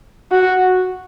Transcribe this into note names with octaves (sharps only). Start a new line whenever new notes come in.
F#4